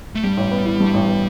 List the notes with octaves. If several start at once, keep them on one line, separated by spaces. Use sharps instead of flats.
A3
G2 G3
A1
B3
E3
G2
A1
B3